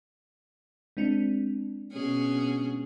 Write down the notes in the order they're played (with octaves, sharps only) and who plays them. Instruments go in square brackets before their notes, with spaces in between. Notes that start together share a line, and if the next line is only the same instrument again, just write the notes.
[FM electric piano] G#3 C4 D4
[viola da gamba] B2 C#4 G#4